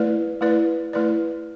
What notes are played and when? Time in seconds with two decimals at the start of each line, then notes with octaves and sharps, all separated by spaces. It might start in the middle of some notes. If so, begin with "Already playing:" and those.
Already playing: A3 E4 B4 D5
0.41 A3 E4 B4 D5
0.93 A3 E4 B4 D5